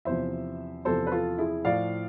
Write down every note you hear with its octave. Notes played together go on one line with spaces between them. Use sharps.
E2 C3 F3 C5 E5
E2 C3 F3 A4 C5
B4
F4 A4
E4 G#4
A2 F3 D5 F5